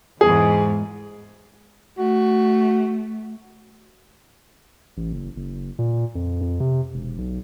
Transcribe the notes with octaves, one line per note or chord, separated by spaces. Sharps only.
E2 G#2 G#4
A3 F#4
A1
F#1
F#1
A#2
F2
F2
C3
E1
B1